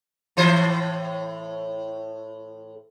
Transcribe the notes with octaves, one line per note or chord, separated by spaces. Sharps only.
A2 E3 C5